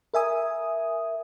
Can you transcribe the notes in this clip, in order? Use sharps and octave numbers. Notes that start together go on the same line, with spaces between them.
A#4 E5 G#5 D#6